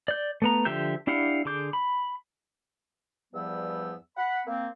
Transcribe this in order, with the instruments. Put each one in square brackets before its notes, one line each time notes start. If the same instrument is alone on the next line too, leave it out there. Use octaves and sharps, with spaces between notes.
[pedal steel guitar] D5 G6
A3 B3 A#5
D3 F3 G4 E5 G6
D4 E4 G4 F5 F#5
D3 G#4 D6 G6
B5
[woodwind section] E2 G2 F3 G3 B3 E6
F#5 B5
A#3 C4